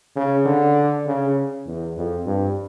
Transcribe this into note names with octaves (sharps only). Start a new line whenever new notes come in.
C#3
D3
C#3
E2
F2
G2